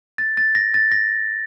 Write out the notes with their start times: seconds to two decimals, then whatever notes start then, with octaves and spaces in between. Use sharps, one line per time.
0.18 A6
0.37 A6
0.55 A#6
0.74 A6
0.92 A#6